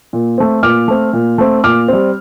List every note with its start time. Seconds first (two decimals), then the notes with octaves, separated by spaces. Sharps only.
0.13 A#2
0.38 A3 C4
0.63 A#2 D6 F6
0.88 A3 C4
1.13 A#2
1.38 A3 C4
1.64 A#2 D6 F6
1.88 G3 C4